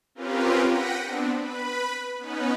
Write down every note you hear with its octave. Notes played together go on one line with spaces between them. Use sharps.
C4 C#4 F4 G4 A#4 B4
F#5 G5 A#6 B6 C#7 D#7
B3 C4 D4
B4 B5
B3 C#4 D#4 B4